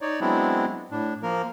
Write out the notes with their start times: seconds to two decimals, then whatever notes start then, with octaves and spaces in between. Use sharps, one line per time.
0.01 D#4 C#5 D5
0.21 F#3 G#3 B3 C4 D4 E4
0.91 A2 D4
1.23 F3 A#3 A#4